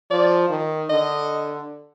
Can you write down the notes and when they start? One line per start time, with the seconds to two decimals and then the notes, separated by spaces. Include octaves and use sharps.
0.11 F3 D5
0.50 D#3
0.90 D3 D#5